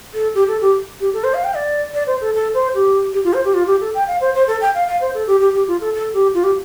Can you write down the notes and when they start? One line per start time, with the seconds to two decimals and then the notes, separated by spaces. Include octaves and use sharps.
0.14 A4
0.35 G4
0.48 A4
0.61 G4
1.00 G4
1.13 A4
1.24 C5
1.34 F5
1.44 G5
1.54 D5
1.94 D5
2.07 C5
2.21 A4
2.34 A4
2.54 C5
2.75 G4
3.14 G4
3.24 F4
3.34 C5
3.45 G4
3.54 F4
3.67 G4
3.81 A4
3.94 G5
4.07 F5
4.21 C5
4.34 C5
4.47 A4
4.61 G5
4.75 F5
4.88 F5
5.01 C5
5.14 A4
5.27 G4
5.40 G4
5.54 G4
5.68 F4
5.81 A4
5.95 A4
6.14 G4
6.34 F4
6.44 G4